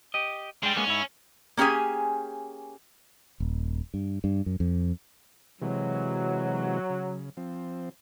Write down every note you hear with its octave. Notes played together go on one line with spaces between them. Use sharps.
G4 D#5
G3 G#3 D4 G5
G#3 A#3 B3 C#4
G#2 E4
A#3 C#4 G4 G#4 G#5
D#1
G2
G2
F#2
F2
C3 E3 F#3 G#3
C#3
F3 C4